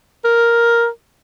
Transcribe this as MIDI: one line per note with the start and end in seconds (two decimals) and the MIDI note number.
0.24 0.88 70